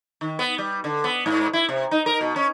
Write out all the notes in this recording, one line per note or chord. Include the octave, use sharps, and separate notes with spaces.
D#3
B3
G3
D3
B3
G#2
E4
C3
D#4
A#4
B2
C#4